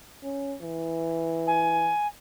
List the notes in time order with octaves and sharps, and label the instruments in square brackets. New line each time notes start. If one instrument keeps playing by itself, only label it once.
[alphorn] C#4
E3
[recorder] G#5